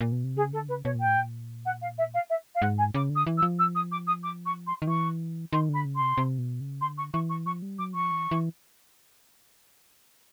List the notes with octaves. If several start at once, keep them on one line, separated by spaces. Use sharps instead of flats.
A#2
B2
C3
C#3 G#4
D3 A4
C#3 B4
B2 C#5
A#2
G5
A2
A#2
F#5
F5
E5
F5
E5
F5
G#2 F#5
G#5
C#3 D6
D3
D#6
E3
E6
F3
E6
D#6
D6
D#6
D6
C#6
C6
D#3
E3 C#6
D#3 C6
D3 B5
C#3
C6
C3
C3
B2
C#3
D3 C6
C#6
E3 C#6
C#6
F3 C#6
G3
F#3 D6
F3 C#6
E3
E3